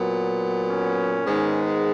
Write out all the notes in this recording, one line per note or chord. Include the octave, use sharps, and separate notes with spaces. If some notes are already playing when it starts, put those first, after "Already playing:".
Already playing: A#2 F#3 B3
C#4
G#2 D#3 G#3 B3